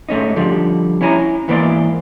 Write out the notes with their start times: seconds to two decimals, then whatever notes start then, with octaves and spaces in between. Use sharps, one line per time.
0.09 G#2 A3 C#4 D#4
0.36 D3 F3 G3
1.01 C#4 E4 C#5 G#5 A#5
1.48 G#2 E3 A#3 B3 C5 D5